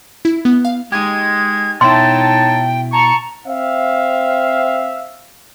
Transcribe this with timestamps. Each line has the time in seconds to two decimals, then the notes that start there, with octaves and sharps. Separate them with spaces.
0.25 E4
0.45 B3
0.65 F5
0.92 G#3 D#4 G4 G#6
1.81 B2 D#4 E4 C#5 E5 G5 A5 C6
2.93 A5 A#5 C#6
3.46 C4 E5 F5